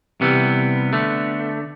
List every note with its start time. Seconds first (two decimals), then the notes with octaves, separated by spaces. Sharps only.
0.21 C3 E3 G3 B3
0.93 D3 A3